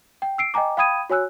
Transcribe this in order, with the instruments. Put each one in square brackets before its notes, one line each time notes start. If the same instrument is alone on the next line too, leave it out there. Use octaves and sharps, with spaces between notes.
[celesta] G5
E6 C7 D7
D#5 G5 G#5 A#5 D6
F5 G5 B5 D#6 G#6 D#7
F#4 C#5 G#5 E6 F#6